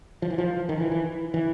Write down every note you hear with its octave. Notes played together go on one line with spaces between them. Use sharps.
F3
E3
F3
D#3
E3
E3
E3